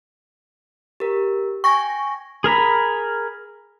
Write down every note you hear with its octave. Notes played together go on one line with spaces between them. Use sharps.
G4 A#4
G5 G#5 C#6 A#6
G#4 A#4 A#5 B5